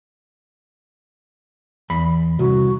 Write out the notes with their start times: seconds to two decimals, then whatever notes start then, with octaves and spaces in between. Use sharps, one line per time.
1.90 E2 B5
2.39 C2 F#4